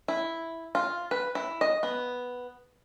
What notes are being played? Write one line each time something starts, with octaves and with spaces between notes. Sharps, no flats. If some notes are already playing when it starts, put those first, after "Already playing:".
E4
F4
B4
E4
D#5
B3